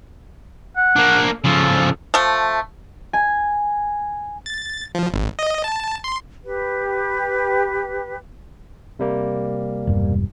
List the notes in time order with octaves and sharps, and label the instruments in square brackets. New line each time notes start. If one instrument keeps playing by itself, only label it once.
[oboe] F#5
[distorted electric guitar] A#3 D4
[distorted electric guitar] C#3 F3 [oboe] A4
[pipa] F3 A3
[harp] G#5
[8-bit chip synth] A6
F3
G#1
D#5
A5
C6
[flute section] G4 B4
[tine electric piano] C3 G3 A#3
[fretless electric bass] E1 G2